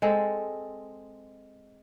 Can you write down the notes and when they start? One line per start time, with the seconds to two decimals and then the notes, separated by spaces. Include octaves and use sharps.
0.02 G#3 C4 A4